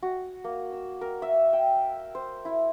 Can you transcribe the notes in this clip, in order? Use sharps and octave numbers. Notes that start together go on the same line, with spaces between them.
F#4
A#3
E6
A#4
E5
G5
C5
E4